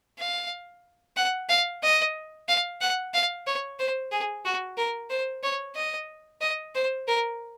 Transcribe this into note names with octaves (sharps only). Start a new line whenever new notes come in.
F5
F#5
F5
D#5
F5
F#5
F5
C#5
C5
G#4
F#4
A#4
C5
C#5
D#5
D#5
C5
A#4